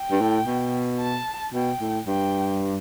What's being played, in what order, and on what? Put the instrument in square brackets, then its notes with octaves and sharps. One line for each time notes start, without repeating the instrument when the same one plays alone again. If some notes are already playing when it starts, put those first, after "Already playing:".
Already playing: [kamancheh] G5
[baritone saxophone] G2
A2
B2
[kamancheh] A5
[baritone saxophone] B2 [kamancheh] G5
[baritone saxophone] A2
[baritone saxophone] G2 [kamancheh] G5